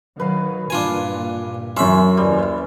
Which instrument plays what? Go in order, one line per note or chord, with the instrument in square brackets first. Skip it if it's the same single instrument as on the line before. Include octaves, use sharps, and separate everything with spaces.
[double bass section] D#3 F#3 [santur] B4 F5
[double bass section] G2 A#2 E3 [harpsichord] D4 F4 G#5
[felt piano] F#2 C6 [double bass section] F#3 [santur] C#4 [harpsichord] E5 B5
[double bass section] D#2 E3 [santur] G3